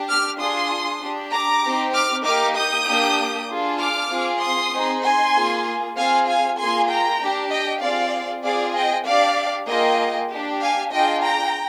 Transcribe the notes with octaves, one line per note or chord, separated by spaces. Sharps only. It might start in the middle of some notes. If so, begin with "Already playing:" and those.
Already playing: D4 G4
D6 F6
D4 F4 G#4 C6 D#6
D4 G4
A#5 D6
C4 D#4 G4
D6 F6
A#3 D#4 G4 D6 F6
D#6 G6
A#3 D4 G4
D4 F4 G#4
D6 F6
C4 F4 G#4
C6 D#6
C4 D#4 G#4
G#5 C6
A#3 F4 G#4
C4 F4 G#4 F5 G#5
F5 G#5
A#3 F4 G#4 G#5 C6
G5 A#5
D4 G4
D#5 G5
C4 F4 G#4 D5 F5
C4 F4 G#4 D5 F5
D#5 G5
D4 G4 D5 F5
A#3 F4 G#4 D#5 G5
D4 G4
F5 G#5
D4 F4 G#4 D#5 G5
G5 A#5